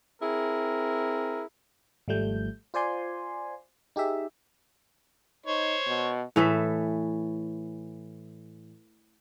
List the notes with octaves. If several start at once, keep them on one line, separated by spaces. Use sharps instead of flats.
C4 E4 G#4 A#4
G#1 F3 G3 A3 G6
F4 C5 D5 G#5 C6
D#4 G4 G#4 E5
D#4 C5 C#5
B2
A2 E3 A4 E5